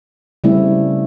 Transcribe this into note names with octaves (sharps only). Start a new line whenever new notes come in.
C#3 G3 A3 C4 E4